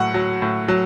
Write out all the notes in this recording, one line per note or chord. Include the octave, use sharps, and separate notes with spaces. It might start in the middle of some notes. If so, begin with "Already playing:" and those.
Already playing: A2 F#3 F#5
F#3
A2
F#3